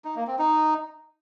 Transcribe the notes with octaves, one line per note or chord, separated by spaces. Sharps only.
D#4
A#3
C4
D#4